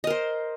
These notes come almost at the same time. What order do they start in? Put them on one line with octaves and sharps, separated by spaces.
D#5 A#4 C5